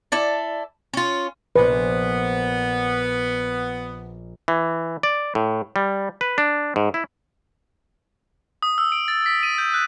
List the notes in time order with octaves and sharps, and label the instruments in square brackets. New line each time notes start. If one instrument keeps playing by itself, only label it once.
[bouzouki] E4 A4 D5
C#4 F4
[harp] A#1 A#2 C5 [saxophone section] B3 [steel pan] B4
[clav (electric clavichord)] E3
D5
A2
G3
B4
D4
G#2
E4
[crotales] D#6
E6
D7
A6
B6
D#7
G6
F#6